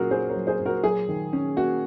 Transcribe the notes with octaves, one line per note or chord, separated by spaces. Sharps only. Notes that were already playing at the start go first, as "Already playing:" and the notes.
Already playing: A#2 F#3 C#4 F#4 G#4 A#4
A#3 G#4 C5
A#4 C#5
F#3
G#4 C5
A#2
F#4 A#4
F#3 G#4
D#3
C#4
A#3 F#4